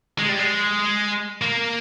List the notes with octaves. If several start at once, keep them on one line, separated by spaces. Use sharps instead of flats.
G#3
G3
G#3
A#3